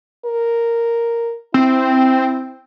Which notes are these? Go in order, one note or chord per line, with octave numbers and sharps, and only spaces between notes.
A#4
C4 E4